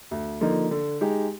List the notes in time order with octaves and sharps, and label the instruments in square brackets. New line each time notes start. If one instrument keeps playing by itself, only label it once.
[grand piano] D2
D3 F3 A#3 D#4
D3
G#3 D#4 G4